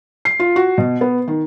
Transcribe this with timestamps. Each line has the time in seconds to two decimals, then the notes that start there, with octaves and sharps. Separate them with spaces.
0.25 C7
0.40 F4
0.56 F#4
0.78 B2
1.01 B3
1.28 D#3